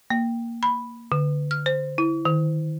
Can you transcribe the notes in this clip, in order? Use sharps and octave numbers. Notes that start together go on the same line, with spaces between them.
A#3
B5
D3
F6
C5
E4
D#3